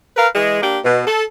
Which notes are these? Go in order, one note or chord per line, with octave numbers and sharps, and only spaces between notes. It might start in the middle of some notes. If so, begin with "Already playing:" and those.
A#4 B4 F5
E3 G#3
A#3 D4 G4
B2
A4